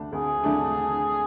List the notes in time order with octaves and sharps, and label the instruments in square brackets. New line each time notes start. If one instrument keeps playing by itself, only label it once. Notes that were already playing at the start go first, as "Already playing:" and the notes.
Already playing: [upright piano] D2 D3 A3 D4
[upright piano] D2 [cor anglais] G#4
[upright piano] D3 A3 D4